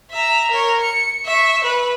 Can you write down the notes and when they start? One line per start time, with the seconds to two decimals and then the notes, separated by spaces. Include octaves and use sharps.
0.11 E5 A#5
0.51 A#4 C#5
0.80 C#7
1.26 E5 C#6
1.64 B4